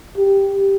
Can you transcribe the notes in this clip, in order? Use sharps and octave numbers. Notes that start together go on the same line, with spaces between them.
G4